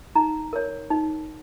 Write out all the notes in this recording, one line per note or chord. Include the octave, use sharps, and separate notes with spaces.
D#4 A#5
A#4 C#5
D#4